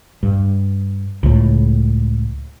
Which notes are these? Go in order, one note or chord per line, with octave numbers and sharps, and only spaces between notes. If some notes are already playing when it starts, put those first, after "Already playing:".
G2
C#2 A2